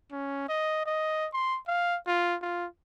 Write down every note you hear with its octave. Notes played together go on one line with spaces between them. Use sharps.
C#4
D#5
D#5
C6
F5
F4
F4